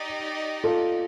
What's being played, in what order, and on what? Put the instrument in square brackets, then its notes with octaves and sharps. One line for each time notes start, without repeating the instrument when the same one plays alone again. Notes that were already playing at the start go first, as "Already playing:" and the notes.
Already playing: [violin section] D#4 G4 D5
[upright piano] F4 A4